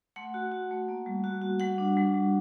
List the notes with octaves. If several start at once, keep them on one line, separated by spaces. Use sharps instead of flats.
A3 F#5
F#4
F#4
A3
A#3
G3
F#4
F#4
G3 F#5
D4
G3
G3